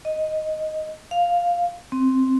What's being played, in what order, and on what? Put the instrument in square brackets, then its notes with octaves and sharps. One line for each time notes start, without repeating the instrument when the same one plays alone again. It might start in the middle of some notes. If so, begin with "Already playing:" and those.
[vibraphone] D#5
F5
C4